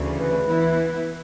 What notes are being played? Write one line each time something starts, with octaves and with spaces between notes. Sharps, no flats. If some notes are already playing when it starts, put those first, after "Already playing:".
Already playing: D2 C#3 E3
B4
E3 B3 E4